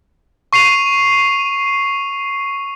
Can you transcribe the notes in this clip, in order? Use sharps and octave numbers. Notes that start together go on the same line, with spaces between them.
C#6 C7 D#7 F7